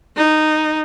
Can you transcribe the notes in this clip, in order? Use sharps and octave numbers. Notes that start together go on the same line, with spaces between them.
D#4